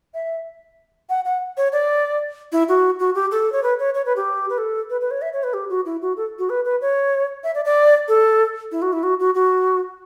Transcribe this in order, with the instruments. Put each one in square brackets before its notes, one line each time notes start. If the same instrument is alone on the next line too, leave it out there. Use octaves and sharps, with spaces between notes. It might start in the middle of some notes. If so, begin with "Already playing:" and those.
[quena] E5
F#5
F#5
C#5
D5
E4
F#4
F#4
G4
A4
C#5
B4
C#5
C#5
B4
G4
B4
A4
B4
B4
C#5
E5
C#5
B4
G4
F#4
E4
F#4
A4
F#4
B4
B4
C#5
E5
D5
D5
A4
E4
F#4
E4
F#4
F#4
F#4